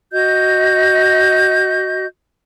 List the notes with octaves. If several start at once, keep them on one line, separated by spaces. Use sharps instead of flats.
F#4 D#5 G6